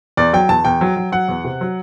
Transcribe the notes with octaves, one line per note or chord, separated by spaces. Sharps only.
E2 D5
F#3 G5
E2 A5
E2 G5
F#3
F#3
F#3 F#5
E2
C3
F#3